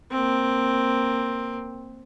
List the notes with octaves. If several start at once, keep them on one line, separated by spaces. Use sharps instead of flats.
A#3 C4